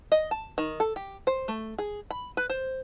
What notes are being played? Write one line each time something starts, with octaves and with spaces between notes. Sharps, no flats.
D#5
A5
D#3
A4
G4
C5
A3
G#4
B5
B4
C5